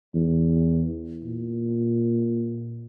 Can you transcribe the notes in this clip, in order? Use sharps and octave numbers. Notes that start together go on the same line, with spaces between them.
E2
A#2